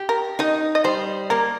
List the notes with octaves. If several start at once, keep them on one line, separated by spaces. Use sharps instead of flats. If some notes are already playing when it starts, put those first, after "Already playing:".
Already playing: G4
A#4
D#4 D#5
D#5
G3 C5
A#3 A#4